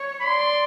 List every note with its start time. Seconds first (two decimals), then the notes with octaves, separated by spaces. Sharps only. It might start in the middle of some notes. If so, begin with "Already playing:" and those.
Already playing: C#5
0.20 B5
0.25 D5 C6